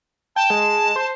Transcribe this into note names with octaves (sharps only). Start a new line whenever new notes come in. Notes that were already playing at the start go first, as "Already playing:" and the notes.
G5 A5
G#3
C5